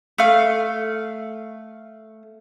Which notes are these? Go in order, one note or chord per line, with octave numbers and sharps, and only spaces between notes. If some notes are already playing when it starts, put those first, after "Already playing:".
A3 F5